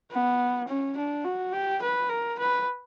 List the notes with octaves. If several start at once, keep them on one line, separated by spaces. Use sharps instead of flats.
B3
C#4
D4
F#4
G4
B4
A#4
B4